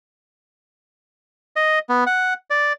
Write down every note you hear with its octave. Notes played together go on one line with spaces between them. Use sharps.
D#5
B3
F#5
D5